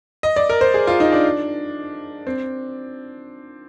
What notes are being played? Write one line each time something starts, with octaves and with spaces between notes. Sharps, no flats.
D#5
D5
A#4
C5
G#4
F4
D#4
D4
C4